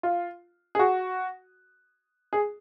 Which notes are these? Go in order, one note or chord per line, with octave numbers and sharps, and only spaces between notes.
F4
G#4
F#4
G#4